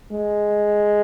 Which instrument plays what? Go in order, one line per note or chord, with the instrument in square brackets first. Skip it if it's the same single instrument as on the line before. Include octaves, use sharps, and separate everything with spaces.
[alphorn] G#3